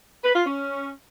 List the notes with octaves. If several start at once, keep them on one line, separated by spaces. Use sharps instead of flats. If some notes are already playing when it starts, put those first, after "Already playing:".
B4
F4
C#4